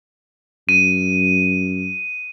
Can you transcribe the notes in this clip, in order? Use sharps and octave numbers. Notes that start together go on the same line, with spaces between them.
F#2 D#7